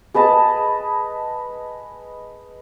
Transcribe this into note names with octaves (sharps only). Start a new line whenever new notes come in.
G#4 B4 D#5 A5